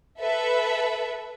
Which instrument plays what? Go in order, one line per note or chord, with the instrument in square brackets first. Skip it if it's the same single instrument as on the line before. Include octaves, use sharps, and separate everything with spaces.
[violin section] A4 B4 E5